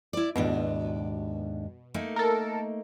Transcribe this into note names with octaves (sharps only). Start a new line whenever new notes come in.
E4 D5
D#2 G#2 B2 D4
A3 A#3 D#4
A4 A#4